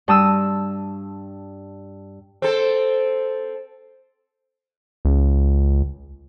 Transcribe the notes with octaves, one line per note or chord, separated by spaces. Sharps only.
G2 A5 D#6 E6
C4 A4
C#2